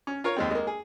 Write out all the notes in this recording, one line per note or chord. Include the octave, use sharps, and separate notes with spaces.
C#4
F4 A#4 C#5
D#2 G#3 C4
G#3 A#3
G#4